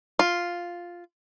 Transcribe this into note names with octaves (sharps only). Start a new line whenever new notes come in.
F4